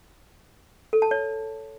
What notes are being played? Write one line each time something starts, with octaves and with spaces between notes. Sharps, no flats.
A4
A5
C#5